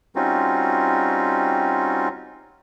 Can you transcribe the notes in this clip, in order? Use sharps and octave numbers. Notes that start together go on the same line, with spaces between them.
G3 C4 C#4 D#4 F4 F#4